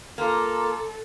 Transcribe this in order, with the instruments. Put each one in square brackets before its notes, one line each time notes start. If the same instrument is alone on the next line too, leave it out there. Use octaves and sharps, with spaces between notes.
[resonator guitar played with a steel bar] A#3 F4 [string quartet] A4 [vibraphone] A#5 C6 D6